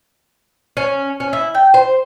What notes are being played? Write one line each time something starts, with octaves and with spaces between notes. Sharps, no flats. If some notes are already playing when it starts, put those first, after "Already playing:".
C#4
C#4
E4
G5
C5